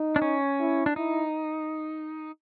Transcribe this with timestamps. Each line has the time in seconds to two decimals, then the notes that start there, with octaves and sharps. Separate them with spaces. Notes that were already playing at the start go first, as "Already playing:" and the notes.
Already playing: D#4
0.16 D4
0.22 C#4
0.59 E4
0.86 D4
0.96 D#4 E4